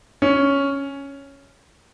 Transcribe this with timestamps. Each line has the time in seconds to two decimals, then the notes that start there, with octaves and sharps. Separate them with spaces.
0.22 C#4